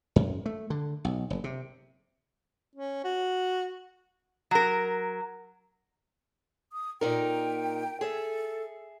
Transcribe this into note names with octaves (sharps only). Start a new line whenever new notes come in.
F#2
A3
D3
B1
F#1
C3
C#4
F#4
F#3 A#4
D#6
A#2 D#4 A#4 G5
G#4 A4 E5